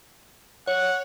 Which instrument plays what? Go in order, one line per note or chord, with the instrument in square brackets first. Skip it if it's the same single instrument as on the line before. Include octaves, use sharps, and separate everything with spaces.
[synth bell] C#5 [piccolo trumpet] F#5